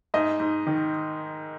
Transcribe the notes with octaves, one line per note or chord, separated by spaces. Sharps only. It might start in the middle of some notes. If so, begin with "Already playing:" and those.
G#2 D#5
G#2
D#3